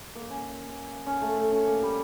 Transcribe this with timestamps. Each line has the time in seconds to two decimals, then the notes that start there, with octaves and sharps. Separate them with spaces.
0.15 A#3
0.30 C#4
1.07 C#4
1.22 A3
1.37 A3
1.52 C#4
1.67 A#3
1.82 G3